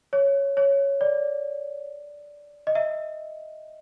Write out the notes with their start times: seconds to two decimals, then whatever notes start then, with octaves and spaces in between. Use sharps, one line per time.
0.13 C#5
0.57 C#5
1.01 D5
2.67 D#5
2.75 E5